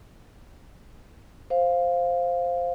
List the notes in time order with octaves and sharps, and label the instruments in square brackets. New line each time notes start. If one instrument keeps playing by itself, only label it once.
[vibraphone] C5 F5